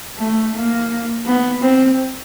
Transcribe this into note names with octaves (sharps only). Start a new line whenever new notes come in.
A3
A#3
B3
C4